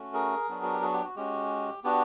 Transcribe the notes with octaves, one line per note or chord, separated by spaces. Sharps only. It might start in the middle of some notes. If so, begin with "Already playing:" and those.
Already playing: A3 C#4 F#4
G#4 A#4
F#3 B3 D4 F#4
F#4
G4
F#4 G#4
G4
F#4
G#3 C#4 F#4 G4
B3 D4 F#4 G4